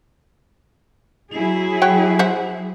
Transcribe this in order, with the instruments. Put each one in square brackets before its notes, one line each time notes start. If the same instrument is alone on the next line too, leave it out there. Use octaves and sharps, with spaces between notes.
[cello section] F#3 E4 G#4
[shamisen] F#4 C#5 G5
C5 E5 F#5